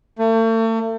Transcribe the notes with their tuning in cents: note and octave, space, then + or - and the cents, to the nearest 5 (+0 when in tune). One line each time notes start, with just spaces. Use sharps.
A3 +40